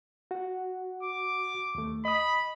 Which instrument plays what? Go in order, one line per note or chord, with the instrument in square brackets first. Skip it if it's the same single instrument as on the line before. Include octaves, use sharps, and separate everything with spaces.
[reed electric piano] F#4 F#5
[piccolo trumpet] D6
[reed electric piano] D#2 A3
[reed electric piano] D#5 D#6 [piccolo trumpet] B5